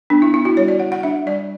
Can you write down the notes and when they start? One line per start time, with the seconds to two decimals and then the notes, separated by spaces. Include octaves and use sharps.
0.10 B3 D4
0.22 E4
0.34 B3 E4
0.45 F#4
0.57 G3 C#5
0.68 D5
0.79 G3 F#5
0.92 F#5
1.03 D4 E5
1.26 G3 D5